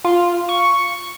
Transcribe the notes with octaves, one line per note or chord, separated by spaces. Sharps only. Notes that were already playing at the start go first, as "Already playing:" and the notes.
F4
C#6